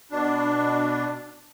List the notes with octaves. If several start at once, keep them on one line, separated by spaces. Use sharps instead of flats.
B2 D4